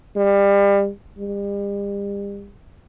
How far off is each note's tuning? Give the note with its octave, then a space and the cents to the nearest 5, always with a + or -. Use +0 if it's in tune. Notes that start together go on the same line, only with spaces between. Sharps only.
G3 +30
G3 +40